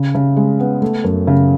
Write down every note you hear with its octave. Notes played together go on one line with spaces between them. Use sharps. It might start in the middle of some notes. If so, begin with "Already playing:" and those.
Already playing: C#3
C#3
G#3
B3
A3
F#2
C#3